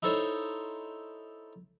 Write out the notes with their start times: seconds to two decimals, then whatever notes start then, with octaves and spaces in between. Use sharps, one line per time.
0.03 D#4 E4 A4 C5 C#5